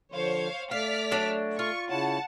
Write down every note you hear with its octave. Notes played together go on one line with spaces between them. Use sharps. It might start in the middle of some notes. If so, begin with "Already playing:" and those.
D3 F3 C5 C#5 F5
A3 D5 F5 F6 B6
F#3 D4
F4 C#6
C#3 E4 C#5 F#5 A5